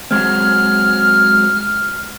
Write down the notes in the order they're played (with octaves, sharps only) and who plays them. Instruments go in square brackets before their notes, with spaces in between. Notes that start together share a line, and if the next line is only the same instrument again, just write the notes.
[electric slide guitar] F#3 G#3 C4 [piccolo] F6